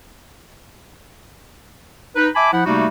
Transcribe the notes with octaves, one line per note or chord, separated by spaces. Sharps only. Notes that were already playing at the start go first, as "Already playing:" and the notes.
D#4 B4
E5 G#5 A5 B5 D6
F3 E4 F#5
C3 G3 A3 A#3 D#4 F#4